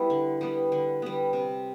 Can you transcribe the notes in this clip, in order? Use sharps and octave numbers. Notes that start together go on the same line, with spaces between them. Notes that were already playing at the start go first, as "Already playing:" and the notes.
Already playing: G3 B3 E4
D3
G3 B3
D3
G3 B3
C3